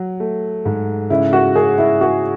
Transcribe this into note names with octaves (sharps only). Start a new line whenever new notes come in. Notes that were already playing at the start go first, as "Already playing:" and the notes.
Already playing: F#3
A3
G#2
C#3 E4
F#4
C#3 G#4
E4
F#4 G#4